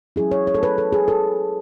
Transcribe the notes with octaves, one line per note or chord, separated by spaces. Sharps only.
F#3 C#4 E4 G#4
C#5
C#5
A4
B4
A4
G#4
A4